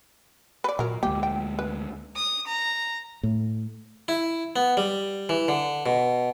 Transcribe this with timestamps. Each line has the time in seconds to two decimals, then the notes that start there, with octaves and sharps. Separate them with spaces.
0.64 B4 D5
0.79 A#2 F#3 A#4
1.03 D2 G#3 A#3 G4
1.23 G5
1.59 B4
2.16 D#6
2.46 A#5
3.23 A2
4.08 E4
4.56 B3
4.77 G3
5.29 E3
5.48 D3
5.86 B2